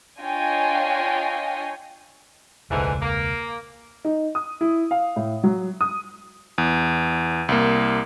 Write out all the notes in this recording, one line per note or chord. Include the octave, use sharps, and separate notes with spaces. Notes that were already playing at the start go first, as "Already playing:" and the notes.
D4 F4 C#5 D#5 G5 G#5
E1 C#2 G#2 D3 E3
A#3
D#4
D#6
E4
F5
A2
F#3
D#6
E2
C2 A#3